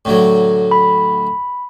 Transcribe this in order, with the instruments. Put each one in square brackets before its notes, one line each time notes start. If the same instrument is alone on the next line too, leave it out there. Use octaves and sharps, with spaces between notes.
[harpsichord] A2 D3 F#3
[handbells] B5